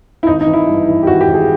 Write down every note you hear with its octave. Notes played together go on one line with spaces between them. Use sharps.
E4
G#1 D#4
D#4
E3
E4
G2
E3
G4
G#1 F#4
G4
G#1
G#4